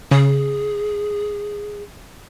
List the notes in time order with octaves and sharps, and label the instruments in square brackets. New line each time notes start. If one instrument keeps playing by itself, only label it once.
[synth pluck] C#3 [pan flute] G#4